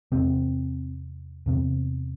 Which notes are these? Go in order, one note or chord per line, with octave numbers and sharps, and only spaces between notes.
E2 C3 C4
E2 C3